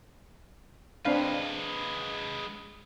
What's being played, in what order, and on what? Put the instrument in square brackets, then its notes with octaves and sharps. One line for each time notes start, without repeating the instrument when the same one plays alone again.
[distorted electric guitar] G#3 B4 [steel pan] C4 D4 F5